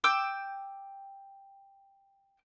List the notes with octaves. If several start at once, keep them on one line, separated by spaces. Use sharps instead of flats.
G5 D6 E6 G6